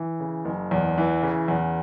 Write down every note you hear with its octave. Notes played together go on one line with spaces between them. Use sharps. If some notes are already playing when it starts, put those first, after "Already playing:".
Already playing: E3
C#3
F#1
E2
E3
C#3
E2